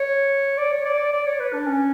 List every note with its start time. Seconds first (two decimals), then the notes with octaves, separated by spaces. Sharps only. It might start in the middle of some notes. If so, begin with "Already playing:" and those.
Already playing: C#5
0.58 D5
0.72 C#5
0.85 D5
0.99 D5
1.13 D5
1.26 C#5
1.40 B4
1.53 D4
1.67 C#4